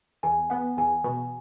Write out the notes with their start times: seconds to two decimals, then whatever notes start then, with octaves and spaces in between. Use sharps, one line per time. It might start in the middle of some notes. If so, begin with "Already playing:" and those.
0.23 E2 G#5
0.50 B3 F#5
0.77 E2 G#5
1.04 B2